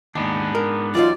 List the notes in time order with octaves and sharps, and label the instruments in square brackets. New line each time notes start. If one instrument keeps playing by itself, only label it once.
[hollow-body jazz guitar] D#2 [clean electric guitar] G#2 B3 D4
[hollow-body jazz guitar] A#4
[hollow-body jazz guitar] E2 F#3 D#4 [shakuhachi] F4 [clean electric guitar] D5